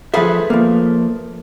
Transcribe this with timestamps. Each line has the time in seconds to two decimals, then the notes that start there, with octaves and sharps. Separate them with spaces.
0.14 F3 A3 G#4 B4 E5
0.50 F3 A#3